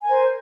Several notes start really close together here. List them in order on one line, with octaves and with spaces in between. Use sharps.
G#5 A#4 C5